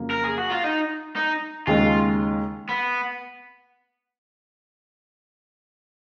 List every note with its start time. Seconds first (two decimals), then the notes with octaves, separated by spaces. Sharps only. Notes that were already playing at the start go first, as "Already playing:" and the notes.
Already playing: F2 C#3 F#3 A#3
0.11 A#4
0.24 G#4
0.38 F#4
0.51 F4
0.64 D#4
1.16 D#4
1.67 D#2 C#3 G#3 D#4 F4
2.69 B3